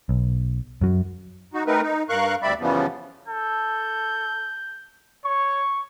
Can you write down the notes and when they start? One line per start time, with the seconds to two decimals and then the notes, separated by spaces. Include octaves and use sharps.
0.09 B1
0.81 F#2 F#3
1.54 D#4 F#4
1.67 A3 C4 D#4 A#4 B4
1.82 D#4
2.09 G2 A#4 F5 C#6 F#6
2.43 D2 G3 C4 D5 E5 B5
2.60 F#2 C#3 E3 F3 G3 B3
3.28 A4 G6
5.25 C#5 C#6